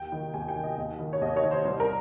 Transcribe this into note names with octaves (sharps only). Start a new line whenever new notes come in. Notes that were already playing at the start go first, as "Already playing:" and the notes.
Already playing: D#2 G5
D#3
D#2 G#5
G5
D#3
D#5
D#2
D#3
C#5
D#2 D#5
C#5
D#3
C5
C2 C5
A#4